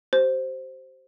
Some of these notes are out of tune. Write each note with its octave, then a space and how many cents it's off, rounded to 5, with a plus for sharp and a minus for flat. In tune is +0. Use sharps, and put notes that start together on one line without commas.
G4 -35 C5 +0